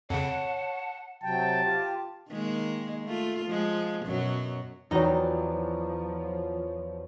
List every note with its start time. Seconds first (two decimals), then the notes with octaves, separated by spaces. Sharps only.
0.10 F2 C#3 C#5 F#5 A5
1.23 C3 F#3 G5 A5
1.64 F4 G4
2.29 D#3 G#3 A#3
3.06 A3 F4
3.46 F3 G#3
4.06 F#2 B2 F#3
4.91 E2 F3 F#3 D#4 F#4 D5 G5 A#5